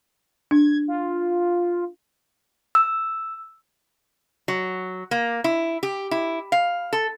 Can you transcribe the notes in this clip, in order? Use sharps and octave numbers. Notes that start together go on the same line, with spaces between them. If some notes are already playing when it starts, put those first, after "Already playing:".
D4 G#6
F4
E6
F#3
A#3
E4
G4
E4
F5
A4